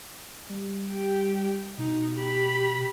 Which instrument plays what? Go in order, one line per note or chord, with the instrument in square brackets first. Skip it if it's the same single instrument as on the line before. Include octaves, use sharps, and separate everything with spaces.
[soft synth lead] G3
[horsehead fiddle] G4 G5
[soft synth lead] B2 [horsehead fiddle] D#4
[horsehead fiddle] G4 B5